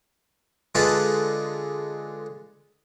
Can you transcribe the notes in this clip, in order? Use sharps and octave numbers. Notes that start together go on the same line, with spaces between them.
D3 G#3 F4 A4 B4